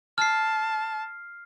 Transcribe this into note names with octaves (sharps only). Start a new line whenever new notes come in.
A5 F6 C7